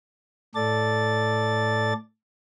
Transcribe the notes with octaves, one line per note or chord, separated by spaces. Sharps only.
A2 A4 D5 A6